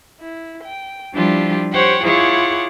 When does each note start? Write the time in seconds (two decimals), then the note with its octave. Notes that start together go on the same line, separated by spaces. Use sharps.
0.21 E4
0.64 G5
1.14 F3 G3 D4 E4 F4 G4
1.72 G4 C5 C#5 F#5 G5
2.04 E4 F4 G#4 C#5 F#5 D6